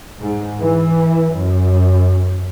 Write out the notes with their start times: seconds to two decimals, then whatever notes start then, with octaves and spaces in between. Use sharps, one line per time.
0.19 G#2
0.60 E3
1.33 F#2